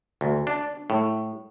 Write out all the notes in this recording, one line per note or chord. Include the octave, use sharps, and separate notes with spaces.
D2
D4
A2